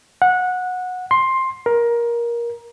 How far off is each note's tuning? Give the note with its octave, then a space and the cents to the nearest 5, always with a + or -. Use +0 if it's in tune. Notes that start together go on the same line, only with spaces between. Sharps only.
F#5 -20
C6 +15
A#4 +15